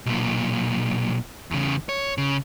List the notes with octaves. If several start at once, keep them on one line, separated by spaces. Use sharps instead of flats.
B1 A#2
E2 C#3
C#5
C#3